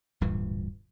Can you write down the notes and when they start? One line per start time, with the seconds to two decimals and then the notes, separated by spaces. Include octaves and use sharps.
0.21 D1 G2 A#2 E3